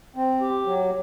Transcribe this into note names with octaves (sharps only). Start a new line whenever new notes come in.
C4
G4
F#3